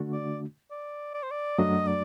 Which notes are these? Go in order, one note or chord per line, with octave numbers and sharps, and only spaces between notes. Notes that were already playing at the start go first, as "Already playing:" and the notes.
Already playing: D3 A3 D4 F#4
D5
D5
D5
C5
D5
F#2 F#3 A3 D4 F#4 D#5
D5